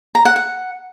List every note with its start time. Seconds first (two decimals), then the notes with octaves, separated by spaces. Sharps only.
0.15 A#5
0.25 F#5
0.36 F#5